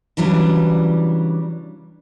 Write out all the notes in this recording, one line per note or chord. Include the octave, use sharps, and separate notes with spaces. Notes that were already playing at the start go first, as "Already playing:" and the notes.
C#3 E3 F#3 G3 D4